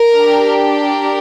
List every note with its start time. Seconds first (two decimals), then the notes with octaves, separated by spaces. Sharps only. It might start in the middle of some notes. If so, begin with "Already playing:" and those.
Already playing: A#4
0.17 D4 G4
0.77 A#4